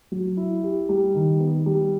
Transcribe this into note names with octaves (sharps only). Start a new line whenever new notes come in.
F#3
E4
G4
G3
D#3
B3
G3